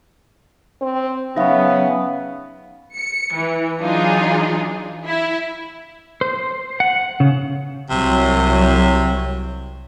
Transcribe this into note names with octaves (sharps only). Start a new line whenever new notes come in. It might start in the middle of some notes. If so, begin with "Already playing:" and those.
C4
C#3 F#3 B3 C#4 D#4 E5 F5
C#7
E3
E3 F#3 D4 D#4 F4 G#4
E4 E5
C5
F#5
C#3
C2 C3 F#3